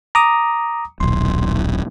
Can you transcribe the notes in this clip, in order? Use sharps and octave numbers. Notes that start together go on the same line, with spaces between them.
A#5 D6 D#6
D#1 B1 C6